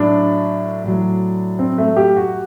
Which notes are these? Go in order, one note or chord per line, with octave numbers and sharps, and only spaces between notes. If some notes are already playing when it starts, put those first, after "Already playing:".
Already playing: A2 F#3 D4
A2 F#3
C4
A3
G4
F#4